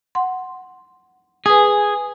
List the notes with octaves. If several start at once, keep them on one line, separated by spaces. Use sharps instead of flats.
F#5 C6
G#4 B4 G#5